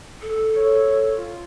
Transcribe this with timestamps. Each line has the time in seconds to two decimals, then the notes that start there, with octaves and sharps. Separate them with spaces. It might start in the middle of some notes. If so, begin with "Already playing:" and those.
0.22 A4
0.56 C#5
1.15 F4